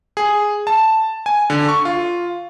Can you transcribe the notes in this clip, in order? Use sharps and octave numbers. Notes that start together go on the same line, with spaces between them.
G#4
A5
G#5
D3
C#6
F4